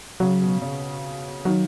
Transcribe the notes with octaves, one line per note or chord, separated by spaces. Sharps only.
C#3 F#3
B2
C#3
D#3 F#3